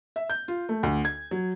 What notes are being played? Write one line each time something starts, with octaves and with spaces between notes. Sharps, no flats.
E5
G6
F4
A3
D2
G#6
F#3